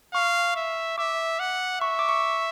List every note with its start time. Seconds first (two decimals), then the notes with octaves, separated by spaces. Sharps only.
0.14 F5 C#6
0.56 E5
0.98 E5 D6
1.40 F#5
1.81 E5 C#6
1.99 D6
2.09 C#6